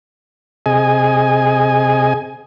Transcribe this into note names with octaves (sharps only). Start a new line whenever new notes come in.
C3 G#4 D#5 G#5